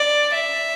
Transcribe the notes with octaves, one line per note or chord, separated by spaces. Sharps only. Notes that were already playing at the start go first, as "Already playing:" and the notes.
Already playing: D5
E5